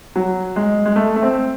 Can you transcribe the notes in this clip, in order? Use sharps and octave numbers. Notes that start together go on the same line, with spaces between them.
F#3
G#3
G#3
A3
A3
C4